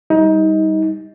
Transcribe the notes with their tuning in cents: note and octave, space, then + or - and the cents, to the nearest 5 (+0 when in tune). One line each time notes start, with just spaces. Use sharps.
G3 +0 D#4 +25